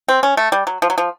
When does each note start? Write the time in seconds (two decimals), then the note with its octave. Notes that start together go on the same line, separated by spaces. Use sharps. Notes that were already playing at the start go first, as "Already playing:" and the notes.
0.09 C4
0.23 C#4
0.37 A3
0.52 G3
0.67 F#3
0.82 F3
0.90 F#3
0.98 F3